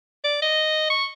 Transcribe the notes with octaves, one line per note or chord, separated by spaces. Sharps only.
D5
D#5
C#6